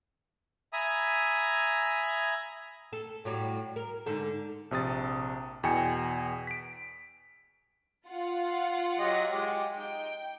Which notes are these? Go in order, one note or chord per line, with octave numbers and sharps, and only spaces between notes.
E5 G#5 A#5 B5 D#6
A4
A2 F#3 G3
A#4
G#2 D3 A4
A#1 C3 D#6 A6
E2 B2 G5 G#5 C#7
B6 D7
F4 F#5
F#3 G4 D#5
G#3 G4
D#4 G5